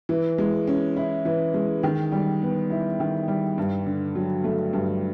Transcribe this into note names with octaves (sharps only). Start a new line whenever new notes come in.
E3
G#3
C#4
E4
E3
G#3
D#3
G3
B3
E4
D#3
G3
G2
D3
F#3
A3
G2